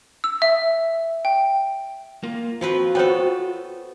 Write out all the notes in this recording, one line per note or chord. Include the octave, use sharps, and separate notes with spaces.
E6
E5
G5
A#3 F4
F3 C4 F4 F#4 B4
B3 A4 C5 C#5 G5